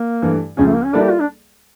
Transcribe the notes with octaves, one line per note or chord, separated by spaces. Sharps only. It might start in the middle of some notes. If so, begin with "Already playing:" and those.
Already playing: A#3
G2 E3 A3
C#2 C#3 F3 C#4
A3
A#3
C#4
G3 A#3 D4 E4 A4 D5
G4
F4
D4